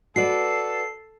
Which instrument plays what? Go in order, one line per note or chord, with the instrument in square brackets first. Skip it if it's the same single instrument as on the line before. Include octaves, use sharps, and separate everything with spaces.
[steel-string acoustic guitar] F#4 B4 D5 [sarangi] A4 [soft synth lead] C7